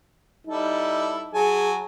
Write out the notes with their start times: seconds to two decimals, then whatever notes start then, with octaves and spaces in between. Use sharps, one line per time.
0.47 G3 D#4 E4 A4
1.34 F#3 G#4 G#5 A5